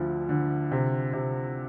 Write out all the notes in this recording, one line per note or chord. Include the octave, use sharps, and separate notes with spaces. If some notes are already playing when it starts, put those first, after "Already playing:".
Already playing: D2 D3 F3
D3
C3
C3